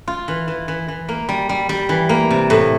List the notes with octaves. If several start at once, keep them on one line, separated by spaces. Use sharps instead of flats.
F4
E3
E3
E3
E3
A#3
G3
G3
G3
E3
A#3
C3
A2